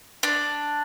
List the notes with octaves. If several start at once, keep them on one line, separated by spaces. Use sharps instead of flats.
D4